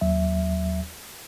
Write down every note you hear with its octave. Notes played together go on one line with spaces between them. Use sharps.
D#2 F#3 E5